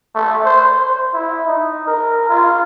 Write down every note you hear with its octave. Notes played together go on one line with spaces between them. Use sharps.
A3
C5
C5
E4
D#4
A#4
F4